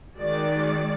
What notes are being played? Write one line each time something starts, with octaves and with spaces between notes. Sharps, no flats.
D#3 G#3 F#4 D5